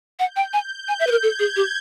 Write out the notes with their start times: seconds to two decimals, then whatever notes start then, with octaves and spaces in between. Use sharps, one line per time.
0.19 F#5 G6
0.36 G5
0.53 G#5
0.87 G#5 G6
1.00 E5
1.07 B4
1.11 A#4
1.22 A4 G#6
1.39 G#4
1.56 G4